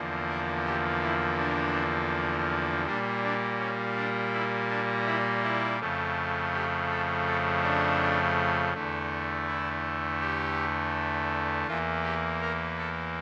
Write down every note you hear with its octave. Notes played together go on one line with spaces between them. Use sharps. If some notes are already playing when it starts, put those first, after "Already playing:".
Already playing: E2 D3 F3 A#3
A#4
G4
E4
D4
A#2 G3 A#3 D4
D4
C#4
D4
E4
D4
E4
E4
F2 C#3 F3 A3
G4
A4
A4
D4
E2 D3 A3
E4
G4
E2 E3 A#3 F4
G4
A#4
A4